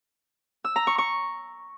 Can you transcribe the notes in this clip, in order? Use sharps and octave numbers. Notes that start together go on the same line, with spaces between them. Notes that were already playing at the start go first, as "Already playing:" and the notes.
E6
A#5
C#6
C#6